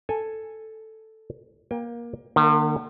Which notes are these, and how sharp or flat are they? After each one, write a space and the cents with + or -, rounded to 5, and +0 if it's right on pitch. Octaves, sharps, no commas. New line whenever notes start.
A4 +0 G#5 +0
A#3 +20 G5 +30
D3 +45 A#3 -10